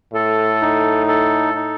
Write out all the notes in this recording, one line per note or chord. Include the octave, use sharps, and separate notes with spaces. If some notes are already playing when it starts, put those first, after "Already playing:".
A2 A4
D#4
A4
D#4